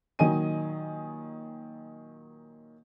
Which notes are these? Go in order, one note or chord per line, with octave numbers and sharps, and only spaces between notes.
A#2 D#3 F#3 D#5 G#5 D#7